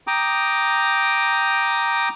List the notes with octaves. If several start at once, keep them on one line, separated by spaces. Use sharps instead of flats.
G5 A#5 D6 D#6